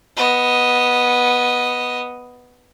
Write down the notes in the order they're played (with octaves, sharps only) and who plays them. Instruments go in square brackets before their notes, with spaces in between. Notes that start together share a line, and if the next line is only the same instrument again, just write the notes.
[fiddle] B3 D#5